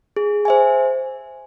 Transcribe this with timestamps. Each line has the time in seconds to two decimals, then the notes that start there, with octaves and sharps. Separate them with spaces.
0.16 G#4
0.45 C5 E5 G#5